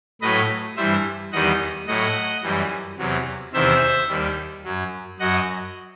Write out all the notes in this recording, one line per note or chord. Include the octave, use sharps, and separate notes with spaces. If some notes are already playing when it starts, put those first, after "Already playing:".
A2 F#3 B4 D#5
G2 E3 G3 C5 E5
E2 D#3 G3 D#5 F#5
A2 F#3 D#5 F#5
F#2 E3 G3
E2 C3 F#3
E2 C3 D#3 C5 E5
D#2 D#3 G3
F#2 F#3
F#2 F#3 D#5 F#5